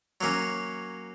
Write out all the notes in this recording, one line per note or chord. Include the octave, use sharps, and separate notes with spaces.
F#3 A#3 C#4